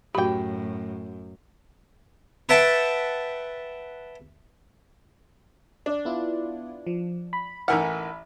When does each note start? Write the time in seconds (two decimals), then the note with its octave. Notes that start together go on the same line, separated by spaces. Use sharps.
0.15 F#2 A2 F#4 G4 G5 B5
2.49 B4 E5 F#5 G5 A5
5.86 D4
6.05 B3 E4 F4
6.86 F3
7.33 B5
7.68 A1 E3 D#4 A#4 E5 F#5 B5 F6